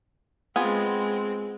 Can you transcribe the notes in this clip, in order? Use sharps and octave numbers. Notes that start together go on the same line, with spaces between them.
G#3 B3 C4 F4 G#4